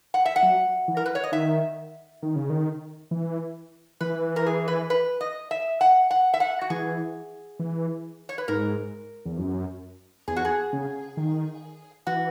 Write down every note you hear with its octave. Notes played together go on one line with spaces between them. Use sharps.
F#5
E5
F#5
F#3
E3
A#4
B4
C#5
D#5
D#3 E5
D#3
C#3
D#3
E3
E3 B4
A#4
G#4
B4
B4
D#5
E5
F#5
F#5
E5
F#5
F#4
E3 G#4
E3
C#5
B4
G#2 A#4
E2
F#2
E2 G#4
F#4
G#4
C#3
D#3
E3 F#4